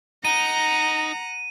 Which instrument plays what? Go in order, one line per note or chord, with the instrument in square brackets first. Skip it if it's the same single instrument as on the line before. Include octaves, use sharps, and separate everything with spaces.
[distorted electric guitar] D#4 [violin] F#5 [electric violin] A#5 [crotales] D#7